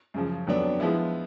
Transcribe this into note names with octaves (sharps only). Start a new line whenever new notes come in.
F#2 C#3 F3
F2 D3 F#3 B3 D4
F3 G#3 B3 E4